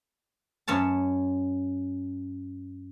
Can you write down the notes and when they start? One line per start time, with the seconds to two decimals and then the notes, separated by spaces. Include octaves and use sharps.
0.68 F#2 C#4 C#5 A5